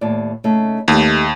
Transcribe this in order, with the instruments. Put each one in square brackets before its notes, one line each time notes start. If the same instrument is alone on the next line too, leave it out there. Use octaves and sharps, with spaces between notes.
[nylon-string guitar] D#2 A2 D5
C#3 A3 D#4
[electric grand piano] D#2 [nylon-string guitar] D#3 A3 G4